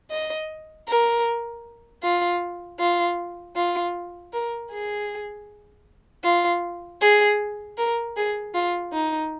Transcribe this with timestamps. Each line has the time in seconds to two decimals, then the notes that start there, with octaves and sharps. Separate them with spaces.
0.11 D#5
0.88 A#4
2.03 F4
2.80 F4
3.56 F4
4.33 A#4
4.71 G#4
6.24 F4
7.01 G#4
7.78 A#4
8.17 G#4
8.54 F4
8.93 D#4